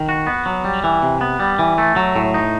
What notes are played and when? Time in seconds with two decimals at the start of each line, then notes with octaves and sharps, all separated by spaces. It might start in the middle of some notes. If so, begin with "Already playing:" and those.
Already playing: D#3
0.09 F#4
0.27 B3
0.46 F#3
0.64 G3
0.84 E3
1.02 C3
1.21 B3
1.40 G3
1.59 E3
1.78 A3
1.96 F#3
2.16 A2
2.34 D#4